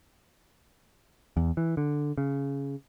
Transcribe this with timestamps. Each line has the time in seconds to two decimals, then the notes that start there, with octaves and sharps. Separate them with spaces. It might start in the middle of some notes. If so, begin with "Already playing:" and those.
1.37 E2
1.57 E3
1.77 D3
2.18 C#3